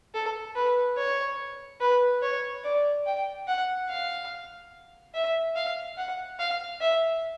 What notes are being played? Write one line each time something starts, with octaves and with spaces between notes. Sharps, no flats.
A4
B4
C#5
B4
C#5
D5
G5
F#5
F5
E5
F5
F#5
F5
E5